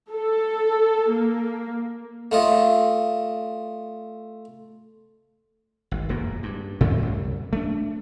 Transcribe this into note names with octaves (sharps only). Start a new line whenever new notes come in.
A4
A#3
A3 F4 D#5
G#1
E1 F#2 A#2 A#3
G2
A2 C#3 A3 C4
C2 F#2
A3 D4